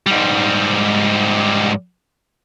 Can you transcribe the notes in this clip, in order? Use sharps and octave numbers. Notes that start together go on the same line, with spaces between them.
G#2 G3